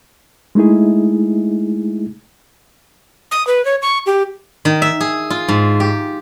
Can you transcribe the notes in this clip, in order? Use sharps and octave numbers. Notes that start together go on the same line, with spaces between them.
G#3 A3 D#4 E4 G#4
D#6
B4
C#5
C#6
G4
D#3
E5
G#4
F4
G#2
G4